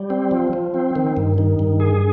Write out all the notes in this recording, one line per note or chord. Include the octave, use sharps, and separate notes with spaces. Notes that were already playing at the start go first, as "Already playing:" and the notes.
Already playing: G3
C4
F3
F3
C4
D#3
G2
D#3
G2
G#4